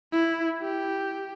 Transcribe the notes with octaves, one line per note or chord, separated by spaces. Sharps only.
E4
G4